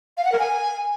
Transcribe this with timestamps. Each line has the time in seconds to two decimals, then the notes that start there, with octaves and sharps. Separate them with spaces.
0.18 F5
0.25 F#5
0.32 A#4
0.39 G#5